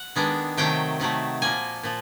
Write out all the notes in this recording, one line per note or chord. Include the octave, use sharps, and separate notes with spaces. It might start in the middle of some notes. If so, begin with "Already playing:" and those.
Already playing: F#5
D#3 G#3 B3 D4
C3 D#3 F#3 A3 G5
C3 D#3 F#3 A3
A#2 F3 A#3 G#5
A#2 F3